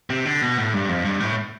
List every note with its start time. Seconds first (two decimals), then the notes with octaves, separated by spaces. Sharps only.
0.10 C3
0.25 D3
0.41 B2
0.57 A2
0.74 G2
0.89 F2
1.05 G2
1.20 A2